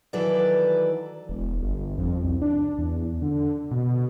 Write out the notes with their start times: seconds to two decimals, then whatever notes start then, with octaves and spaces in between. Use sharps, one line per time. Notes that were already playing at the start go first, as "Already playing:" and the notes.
0.13 D#3 E3 F#3 A4 B4 D5
1.29 E1
1.62 G1
1.98 F2
2.24 C2
2.42 D4
2.78 E2
3.22 D3
3.71 B2